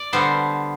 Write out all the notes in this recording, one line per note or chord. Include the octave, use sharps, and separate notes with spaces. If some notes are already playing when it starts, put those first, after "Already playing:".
Already playing: D5
D3 G3 B3 C5